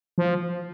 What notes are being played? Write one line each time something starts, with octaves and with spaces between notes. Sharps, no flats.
F3